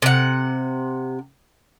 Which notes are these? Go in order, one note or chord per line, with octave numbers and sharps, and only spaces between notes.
C3 F#5